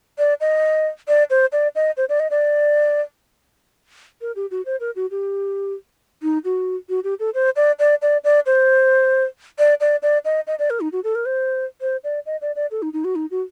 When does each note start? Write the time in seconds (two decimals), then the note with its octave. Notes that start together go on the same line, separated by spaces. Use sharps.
0.18 D5
0.40 D#5
1.08 D5
1.30 C5
1.52 D5
1.75 D#5
1.97 C5
2.09 D5
2.20 D#5
2.30 D5
4.21 A#4
4.36 G4
4.51 F#4
4.66 C5
4.80 A#4
4.96 F#4
5.11 G4
6.22 D#4
6.44 F#4
6.89 F#4
7.04 G4
7.20 A4
7.34 C5
7.56 D5
7.79 D5
8.02 D5
8.24 D5
8.46 C5
9.59 D5
9.80 D5
10.02 D5
10.25 D#5
10.47 D#5
10.59 D5
10.70 A#4
10.80 D#4
10.92 F#4
11.04 A4
11.15 A#4
11.26 C5
11.81 C5
12.04 D5
12.26 D#5
12.41 D5
12.56 D5
12.71 A4
12.82 D#4
12.93 D#4
13.04 F#4
13.15 D#4
13.31 F#4